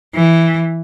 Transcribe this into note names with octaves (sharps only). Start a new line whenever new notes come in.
E3